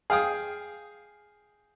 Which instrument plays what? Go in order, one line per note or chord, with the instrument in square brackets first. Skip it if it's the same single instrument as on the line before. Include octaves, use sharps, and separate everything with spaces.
[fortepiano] G#4 F5 G5 D#6